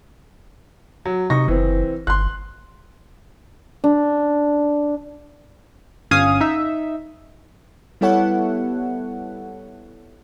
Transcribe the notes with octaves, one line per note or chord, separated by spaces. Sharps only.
F#3
C3 D#4 C#6 A#6
F#1 E3 C4
G1 C6 F#6
D4
G1 C#4 F5 G#5 D#6
D#4 E5
G3 B3 E4 A4 C#5 F#5